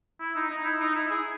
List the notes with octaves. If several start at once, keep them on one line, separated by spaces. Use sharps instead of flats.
E4
D#4
D#4
E4
D#4
E4
G#4